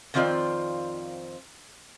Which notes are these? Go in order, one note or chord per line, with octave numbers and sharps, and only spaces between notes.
F2 D#3 C4 F4 C5 D5